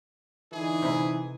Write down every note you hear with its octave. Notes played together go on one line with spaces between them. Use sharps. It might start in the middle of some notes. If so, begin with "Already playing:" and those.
D3 E3 D#4 G#4
C3 E4